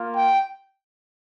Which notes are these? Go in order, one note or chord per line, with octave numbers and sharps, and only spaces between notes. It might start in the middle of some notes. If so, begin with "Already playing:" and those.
Already playing: A#3 F4
G5